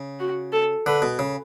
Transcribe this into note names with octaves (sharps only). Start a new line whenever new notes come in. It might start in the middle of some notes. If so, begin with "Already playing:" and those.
Already playing: C#3
F#4
A4
D3 B4
B2
C#3